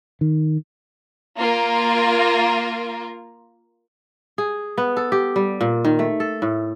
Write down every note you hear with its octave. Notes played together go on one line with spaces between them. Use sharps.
D#3
A#3 F4 A#4
G#4
B3
A4
G4
G3
A#2
D#3
A3
A4
A2